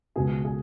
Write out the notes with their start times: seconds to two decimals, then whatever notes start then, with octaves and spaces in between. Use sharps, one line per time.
0.16 C#2 B2 G#4
0.44 G#4